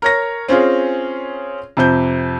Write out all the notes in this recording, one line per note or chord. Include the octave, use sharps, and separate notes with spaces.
A#4 C#5 A#6
C4 C#4 F4 G#4
F2 C3 C5 G6